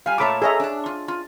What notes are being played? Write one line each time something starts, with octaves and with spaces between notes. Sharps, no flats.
G3 F5 G#5
A#2 A3 C#5 A5 B5 D6
G#4 A4 C#5 D#5 E5 A#5
D4 A5
F4
F4